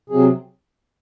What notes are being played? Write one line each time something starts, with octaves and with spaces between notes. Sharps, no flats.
C3 F#3 C4 G#4